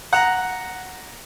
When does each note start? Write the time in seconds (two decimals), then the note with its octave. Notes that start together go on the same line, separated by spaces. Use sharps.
0.13 F#5 A#5